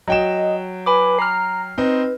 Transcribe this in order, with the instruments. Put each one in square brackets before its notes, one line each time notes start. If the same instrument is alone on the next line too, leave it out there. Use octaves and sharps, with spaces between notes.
[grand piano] F#3 G5 E7 [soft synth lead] D#5
[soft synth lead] B4 [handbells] G#5 B5 D6
[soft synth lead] A#5 [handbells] F6 C7
[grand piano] C4 D#4 [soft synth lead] B4